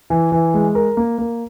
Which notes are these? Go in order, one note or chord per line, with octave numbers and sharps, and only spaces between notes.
E3
E3
G#3
A#4
A#3
A#3